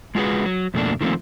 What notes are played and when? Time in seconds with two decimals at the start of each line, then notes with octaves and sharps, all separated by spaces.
0.15 G#3 F4 F#4 G#4 B4
0.46 F#3
0.74 F2 B2 A3 A#3 D4
1.01 D#3 F3 A3 A#3 C4